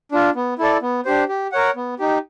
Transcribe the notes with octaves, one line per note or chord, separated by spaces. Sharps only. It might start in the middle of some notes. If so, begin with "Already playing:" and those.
D4 F4
B3
E4 A4 D5
B3
D4 G4 C5
G4
A#4 C#5 F#5
B3
D#4 G4